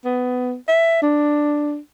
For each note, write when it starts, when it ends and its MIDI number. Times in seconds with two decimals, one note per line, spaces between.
0.05 0.55 59
0.68 1.02 76
1.02 1.78 62